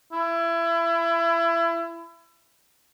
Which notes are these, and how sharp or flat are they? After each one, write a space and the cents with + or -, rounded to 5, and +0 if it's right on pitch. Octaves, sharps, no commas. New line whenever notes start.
E4 +30